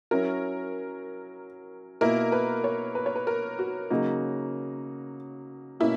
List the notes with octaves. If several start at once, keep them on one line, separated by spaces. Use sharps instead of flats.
F#3 C#4 E4 A#4
B2 A#3 E4 A#4
B4
C#5
B4
C#5
B4
A#4
F#4
C#3 F#3 A#3 D#4
B2 A#3 C#4 E4